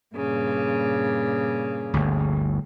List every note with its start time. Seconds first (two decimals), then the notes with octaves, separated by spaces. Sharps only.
0.15 G2 A#2 C#3
1.93 G1 D2